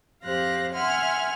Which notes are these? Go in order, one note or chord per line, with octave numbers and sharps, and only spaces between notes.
F2 G4 C5 F5 F#6 A#6
E5 F#5 G#5 C6 F6